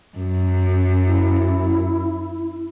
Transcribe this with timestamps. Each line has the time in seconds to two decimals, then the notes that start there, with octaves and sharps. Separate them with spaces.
0.17 F#2
1.06 E4